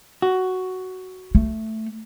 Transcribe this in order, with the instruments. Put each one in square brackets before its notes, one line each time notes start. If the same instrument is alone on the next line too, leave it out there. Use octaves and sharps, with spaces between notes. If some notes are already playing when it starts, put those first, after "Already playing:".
[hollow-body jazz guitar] F#4
[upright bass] A3